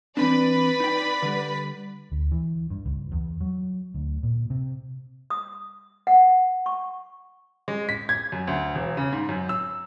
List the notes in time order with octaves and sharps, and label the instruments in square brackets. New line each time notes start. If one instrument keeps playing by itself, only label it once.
[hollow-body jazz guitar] E3 C4 D4 [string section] B4 D5 B5
[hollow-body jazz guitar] D#4 G5
D3 G3
[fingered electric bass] D2
E3
G2
C#2
E2
F#3
D2
A#2
C3
[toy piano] D#6
F#5
C#6
[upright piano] G#3
B6
G#6
F#2
D2
E1
C#3
G#2
F#2
E6